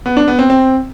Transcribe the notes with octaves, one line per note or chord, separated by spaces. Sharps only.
B3
D4
B3
C4
C4